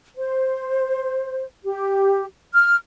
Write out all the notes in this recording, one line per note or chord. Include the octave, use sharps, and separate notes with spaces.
C5
G4
F6